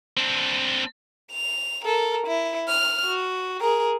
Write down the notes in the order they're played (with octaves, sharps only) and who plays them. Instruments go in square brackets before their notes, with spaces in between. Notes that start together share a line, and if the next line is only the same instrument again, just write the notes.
[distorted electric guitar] C4 D4
[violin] F7
A4 A#4
E4
F6
F#4
G#4 A#4